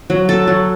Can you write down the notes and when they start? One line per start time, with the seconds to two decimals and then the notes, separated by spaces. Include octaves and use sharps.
0.10 F#3
0.29 A4
0.47 F#3